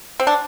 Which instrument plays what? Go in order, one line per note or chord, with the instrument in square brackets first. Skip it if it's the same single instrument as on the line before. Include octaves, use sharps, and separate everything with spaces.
[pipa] C4
D4